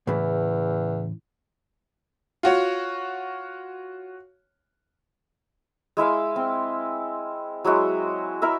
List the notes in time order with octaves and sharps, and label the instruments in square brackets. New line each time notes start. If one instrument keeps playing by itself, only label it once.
[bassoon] E2 [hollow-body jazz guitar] A2 C#3 E3
[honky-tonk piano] F4 F#4 C#5
[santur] G#3 E4 E5 F5
C4
F#3 G#3 E4 F#4
E4 A#4 E5